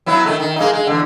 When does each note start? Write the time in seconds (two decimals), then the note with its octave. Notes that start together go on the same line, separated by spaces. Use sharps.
0.06 F#3 B3 E4
0.26 D#3 A3
0.40 D#3
0.56 G#3 A#3 D#4
0.74 G#3
0.87 E2 D3